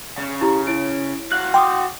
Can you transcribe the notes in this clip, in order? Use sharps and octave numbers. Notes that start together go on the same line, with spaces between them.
C#3
E4 G4 A#5
E4 C#5 D7
F#4 F5 F#6
G5 C6 D6 D#6